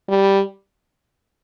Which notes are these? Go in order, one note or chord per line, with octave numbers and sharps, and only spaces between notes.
G3